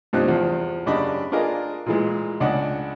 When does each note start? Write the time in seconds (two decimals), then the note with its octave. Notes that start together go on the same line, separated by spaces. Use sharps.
0.13 G2 C3 F3 D#4 F#6
0.28 E2 F3
0.86 F#2 C#3 D4 G4 D#5 B5
1.32 D4 F4 G#4 A#4 D#5
1.86 A#2 E3 G#3
2.40 C#2 D4 D#5 F#5